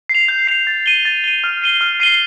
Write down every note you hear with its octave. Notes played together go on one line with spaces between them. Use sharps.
C7
F7
G6
C7 F7
A6
D#7 G7
A6
D#7 G7
F6
C7 D#7 G7
F6
C7 D#7 G7